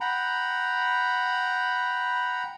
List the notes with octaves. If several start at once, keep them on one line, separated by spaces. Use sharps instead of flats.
F#5 G5 A#5 B5